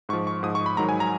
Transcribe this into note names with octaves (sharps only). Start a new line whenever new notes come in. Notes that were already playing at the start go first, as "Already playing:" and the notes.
G#2 F3 C#6
C#6
G#2 F3 D#6
C#6
B5
G#2 D#3 F#3 A#5
G#5
A#5